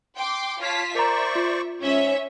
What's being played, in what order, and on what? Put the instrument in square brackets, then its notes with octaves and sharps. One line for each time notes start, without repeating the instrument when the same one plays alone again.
[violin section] G5 C6 D6
[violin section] F4 A5 B6 [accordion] C#5 F5
[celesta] A#4 A#5 [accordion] C5 D5 C#6 [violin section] E5
[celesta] F4
[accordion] G#2 [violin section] C#4 C#5 E5